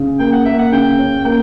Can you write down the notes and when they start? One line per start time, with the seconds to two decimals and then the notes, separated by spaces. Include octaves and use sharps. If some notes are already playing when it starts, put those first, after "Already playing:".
Already playing: C#3
0.20 A#3 G5
0.33 F#5
0.46 A#3 E5
0.59 F#5
0.72 C#3 G5
0.99 C#4
1.25 A#3 G5